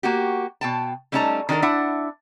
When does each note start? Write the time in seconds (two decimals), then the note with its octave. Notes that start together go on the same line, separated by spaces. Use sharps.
0.03 A#3 F#4 G4
0.61 B2 G5 A5
1.12 G3 A3 C#4 D#4 A5 A#5
1.49 D#3 D4 G4 A4 A#4
1.62 D4 E4 E5 F#5